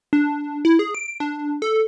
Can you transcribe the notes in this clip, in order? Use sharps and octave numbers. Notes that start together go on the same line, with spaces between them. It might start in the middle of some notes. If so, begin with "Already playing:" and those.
D4
E4
G#4
D7
D4
A4